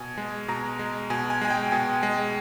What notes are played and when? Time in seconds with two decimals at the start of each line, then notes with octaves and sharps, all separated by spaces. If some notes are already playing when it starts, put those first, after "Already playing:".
Already playing: B2 G#5
0.18 G#3
0.48 B2 A#5
0.79 G#3
1.10 B2 G#5
1.30 G#5
1.41 G#3 G#5
1.50 G5
1.71 B2 G#5
2.03 G#3